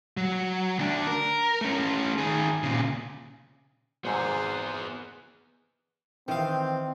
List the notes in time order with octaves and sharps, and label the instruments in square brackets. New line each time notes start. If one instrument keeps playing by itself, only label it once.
[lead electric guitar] F#3
D2 D4
A#4
A3 C#4
D#3 G#4
A#2 C#3
[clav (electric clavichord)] G#1 G#2 C3 [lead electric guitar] B3 G#4 [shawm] C5
[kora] D#3 [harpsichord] E3 F5 [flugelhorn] C4